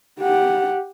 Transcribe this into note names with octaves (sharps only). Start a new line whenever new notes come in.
G4 F#5